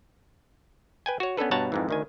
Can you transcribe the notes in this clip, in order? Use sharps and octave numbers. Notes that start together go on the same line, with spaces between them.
B4 G5 G#5
F#4 C#5
B3 C#4 D4 A4 B4
G2 B2 C#5 F#5 A5 A#5
F2 G#2 E3
D2 D#3 G#5